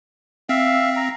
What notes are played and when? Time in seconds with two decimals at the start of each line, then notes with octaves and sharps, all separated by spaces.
0.49 C4 E5 F5
0.96 A#5